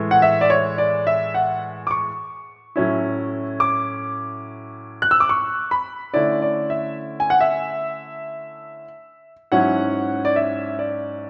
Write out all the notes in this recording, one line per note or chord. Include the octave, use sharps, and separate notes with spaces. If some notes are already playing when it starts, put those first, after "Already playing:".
Already playing: A2 E3 G#3
F#5
E5
D5
C#5
D5
E5
F#5
D6
C#6
A2 F#3 C#4 E4
D6
F#6
E6
D6
C#6
B5
D3 A3 C#4 E4 D5
D5
E5
G#5
F#5
E5
G#2 F#3 C#4 E4 F#5
D5
E5
D5